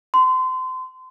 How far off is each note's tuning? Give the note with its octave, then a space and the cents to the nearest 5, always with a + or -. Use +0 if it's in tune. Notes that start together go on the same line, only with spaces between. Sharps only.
C6 -30